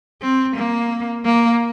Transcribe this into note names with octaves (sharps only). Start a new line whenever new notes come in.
C4
A#3
A#3